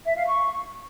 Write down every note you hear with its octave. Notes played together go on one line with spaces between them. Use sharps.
E5
F5
C#6